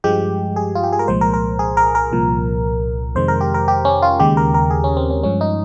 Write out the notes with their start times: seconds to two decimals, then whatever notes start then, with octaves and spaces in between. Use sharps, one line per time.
0.04 G2 F3 G#3 G4
0.56 G#4
0.75 F4
0.83 G4
0.93 G#4
0.99 A#4
1.08 C2 A#2 F3 G#3 C5
1.21 A#4
1.34 A#4
1.59 G#4
1.77 A#4
1.95 A#4
2.12 C2 A#2 F3
3.15 F2 C3 D#3 G#3 C5
3.28 A#4
3.41 G4
3.54 A#4
3.68 G4
3.85 C#4
4.02 F4
4.20 D#2 C#3 G#3 G4
4.37 A#4
4.54 A#4
4.70 G#4
4.84 C#4
4.97 C4
5.10 C#4
5.23 G2 F3 G#3 C#4
5.41 D#4